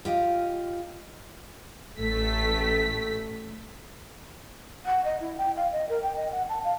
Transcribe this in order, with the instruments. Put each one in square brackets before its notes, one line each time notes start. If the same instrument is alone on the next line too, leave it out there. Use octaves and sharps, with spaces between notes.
[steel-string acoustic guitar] F4 G4 D#5 F5
[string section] A1 A3 B6
[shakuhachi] F#5
D#5
E4
G5
F5
D#5
A#4
G5
D#5
F#5
A5
F5